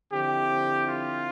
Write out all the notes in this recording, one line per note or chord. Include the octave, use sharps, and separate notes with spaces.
D3 F3 C4 E4 G4
F4